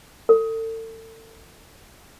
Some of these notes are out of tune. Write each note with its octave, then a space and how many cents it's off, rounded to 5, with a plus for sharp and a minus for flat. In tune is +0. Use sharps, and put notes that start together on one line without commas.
A4 +35